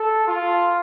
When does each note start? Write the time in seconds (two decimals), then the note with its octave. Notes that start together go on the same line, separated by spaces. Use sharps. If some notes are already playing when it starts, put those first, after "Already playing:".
Already playing: A4
0.26 F4